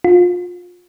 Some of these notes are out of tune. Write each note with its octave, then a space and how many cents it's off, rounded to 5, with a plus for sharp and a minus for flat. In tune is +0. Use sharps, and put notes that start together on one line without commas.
F4 +25